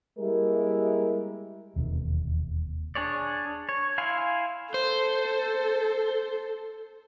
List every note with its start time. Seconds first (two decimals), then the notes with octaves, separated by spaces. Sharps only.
0.19 G3 G#3 A#3 E4 G4 A#4
1.76 E1 D#2 C3
2.95 D4 G#4 C#5 D5
3.69 C#5
3.98 E4 F5 G#5 C6
4.74 A4 C5